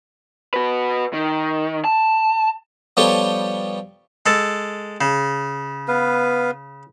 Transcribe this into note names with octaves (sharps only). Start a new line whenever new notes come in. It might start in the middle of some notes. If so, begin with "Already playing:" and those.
F#4 B4
D#3
A5
F3 G3 B3 G4 A4 C#5
G#3 A4
C#3
B3 B4 F5